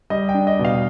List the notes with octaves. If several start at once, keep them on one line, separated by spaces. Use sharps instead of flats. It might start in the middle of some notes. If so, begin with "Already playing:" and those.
G3 D#5
G5
D4
D#5
B2
F5